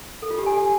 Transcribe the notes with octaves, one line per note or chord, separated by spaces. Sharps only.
A4
F4
G4
G#5